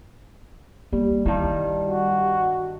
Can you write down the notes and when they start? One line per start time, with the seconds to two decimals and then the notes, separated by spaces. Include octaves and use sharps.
0.93 G3 A#3
1.26 G2 D#3 E4
1.87 F#4